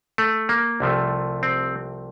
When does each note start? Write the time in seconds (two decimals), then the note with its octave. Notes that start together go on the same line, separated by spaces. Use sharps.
0.18 A3
0.49 A#3
0.80 C2 C3 F3 A3
1.43 C4